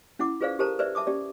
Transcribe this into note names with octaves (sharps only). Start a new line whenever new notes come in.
C#4 E4 F#5 D6
F4 G#4 B4 C5 D5 F5
G4 A4 A#4 C5 A5 A#5
B4 C5 D5 E5
E5 A5 D6 D#6
C#4 G4 D5